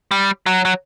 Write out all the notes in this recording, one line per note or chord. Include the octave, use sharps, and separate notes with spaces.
G3
F#3
F#3